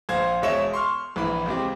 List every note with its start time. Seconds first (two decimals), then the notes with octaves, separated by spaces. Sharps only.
0.09 A#1 C5 F5 G#6
0.42 E1 G#3 C#5 E5 E7
0.74 C6 C#6 F6
1.16 A#1 E3 B5
1.46 C#2 C4 G4